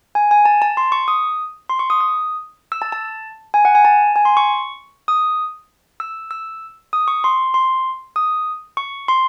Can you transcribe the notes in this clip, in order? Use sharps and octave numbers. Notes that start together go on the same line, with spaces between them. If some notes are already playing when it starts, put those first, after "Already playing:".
G#5
G#5
A5
A5
C6
C#6
D#6
C6
C#6
D#6
D#6
E6
A5
A5
G#5
F#5
G#5
A5
G#5
C6
C#6
D#6
E6
E6
D#6
C#6
C6
C6
D#6
C#6
C6